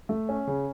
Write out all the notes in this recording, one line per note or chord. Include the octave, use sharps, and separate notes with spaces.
A3
C#4
C#3